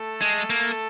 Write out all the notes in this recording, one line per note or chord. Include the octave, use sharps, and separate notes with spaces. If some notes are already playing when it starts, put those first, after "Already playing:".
Already playing: A3 A4
G#3
A#3